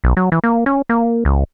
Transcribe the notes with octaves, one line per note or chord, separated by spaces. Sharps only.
B1
F#3
E3
A#3
C#4
A#3
C#2